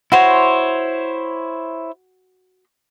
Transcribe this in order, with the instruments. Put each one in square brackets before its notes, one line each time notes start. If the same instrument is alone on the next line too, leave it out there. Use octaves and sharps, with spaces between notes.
[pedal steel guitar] E4 C5 C#5 [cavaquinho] F#4 C6